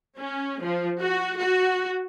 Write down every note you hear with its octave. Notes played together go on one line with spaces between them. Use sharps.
C#4
F3
F#4
F#4